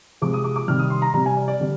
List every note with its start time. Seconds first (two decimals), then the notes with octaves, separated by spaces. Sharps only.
0.22 C3 F3 G#3 D6
0.34 D#6
0.44 D6
0.56 D6
0.68 C3 D#3 G3 F6
0.79 D#6
0.90 C6
1.02 A#5
1.14 C3 G3 A#5
1.26 G#5
1.37 D5
1.48 D5
1.60 D3 G3